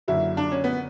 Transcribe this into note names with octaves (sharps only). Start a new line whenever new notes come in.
F#1 F#2 D3 F#3 E4
D4
C#4
B3